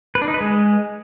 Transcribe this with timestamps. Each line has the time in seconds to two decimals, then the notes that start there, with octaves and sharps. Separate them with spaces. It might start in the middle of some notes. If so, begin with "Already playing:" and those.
0.15 B4
0.22 D4
0.28 D#4
0.34 B4
0.41 G#3